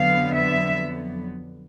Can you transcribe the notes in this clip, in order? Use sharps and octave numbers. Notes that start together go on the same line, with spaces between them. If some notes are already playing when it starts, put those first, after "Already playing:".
Already playing: F2 D3 F#3 B3 F5
E5